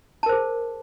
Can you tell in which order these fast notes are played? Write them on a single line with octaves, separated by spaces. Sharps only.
A5 A#4 C5 G#4